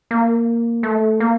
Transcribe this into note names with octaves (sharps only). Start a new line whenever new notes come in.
A#3
A3
A#3